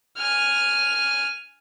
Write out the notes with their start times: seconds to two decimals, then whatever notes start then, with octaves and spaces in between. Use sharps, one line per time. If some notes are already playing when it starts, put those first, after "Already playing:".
0.18 G#5 F6